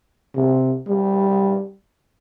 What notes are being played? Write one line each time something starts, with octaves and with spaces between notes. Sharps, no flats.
C3
G3